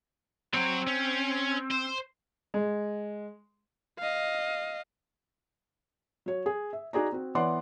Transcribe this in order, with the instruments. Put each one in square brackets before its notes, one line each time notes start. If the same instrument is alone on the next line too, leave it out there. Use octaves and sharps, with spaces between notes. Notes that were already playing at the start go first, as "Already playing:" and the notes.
[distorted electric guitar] F#3 C#5 [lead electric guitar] C4
[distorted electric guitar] C#4
C5
[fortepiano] G#3
[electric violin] D#5 F5
[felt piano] F#3 C#5
G#4
E5
D#4 F#4 G#4 D5 A#5
C4 F#4
E3 B3 C#5 D5 F#5 C6